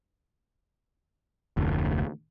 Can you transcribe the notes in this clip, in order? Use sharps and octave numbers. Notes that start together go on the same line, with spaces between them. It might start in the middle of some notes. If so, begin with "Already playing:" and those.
F1 D2